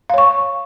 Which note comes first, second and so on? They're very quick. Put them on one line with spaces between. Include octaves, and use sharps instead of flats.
F5 C#5 C#6